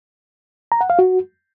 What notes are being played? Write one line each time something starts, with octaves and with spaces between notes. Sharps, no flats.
A#5
F#5
F5
F#4